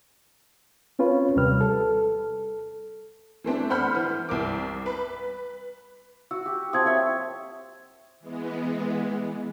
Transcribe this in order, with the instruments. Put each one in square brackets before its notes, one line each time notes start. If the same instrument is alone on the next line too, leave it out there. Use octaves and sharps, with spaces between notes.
[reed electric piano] C4 C#4 F4 B4 C#5
D#2 C3 G3 B4 F6
A4
[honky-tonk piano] E3 A3 C4 D4
C5 F#5 B5 F6 G6
E3
C2 A#4 D6
B4
[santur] F#4 [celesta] E6
[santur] G4
[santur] F3 C4 F#5 [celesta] D#6 G#6
[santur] F4 C#5 E5
[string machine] E3 G#3 B3